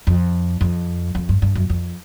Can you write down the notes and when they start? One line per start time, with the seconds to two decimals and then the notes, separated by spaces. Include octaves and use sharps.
0.07 F2
0.61 F2
1.15 F2
1.29 G2
1.42 G2
1.55 F#2
1.70 F2